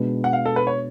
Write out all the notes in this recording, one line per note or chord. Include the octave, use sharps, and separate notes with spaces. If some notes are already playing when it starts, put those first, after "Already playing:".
Already playing: B2 G#3 B3 D4
F#5
F5
A4
B4
C#5